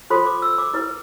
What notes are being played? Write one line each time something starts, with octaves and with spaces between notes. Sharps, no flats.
F4 A4 C5 C6
D6
E6
D6
E4 B4